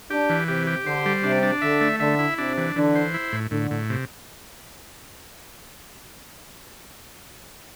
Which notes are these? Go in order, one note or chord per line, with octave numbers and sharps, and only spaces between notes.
D4 G4
E3
C3 G4
G4
D3 C5
G3
C3 D4
D4
D3 E5
A3
D3 E5
E4
C3 D4
E3
D3 E3
C5
E4
A2
A2 D3
A2
C3